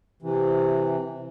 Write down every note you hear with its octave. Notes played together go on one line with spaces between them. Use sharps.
C3 E3